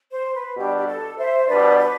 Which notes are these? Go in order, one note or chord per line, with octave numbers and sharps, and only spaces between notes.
C5
B4
B2 G3 D4 G4
G4
A4
C5 E5
B2 G3 D4 B4 D5
B4